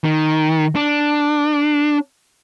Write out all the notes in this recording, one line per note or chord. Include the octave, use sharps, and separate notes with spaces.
D#3
D4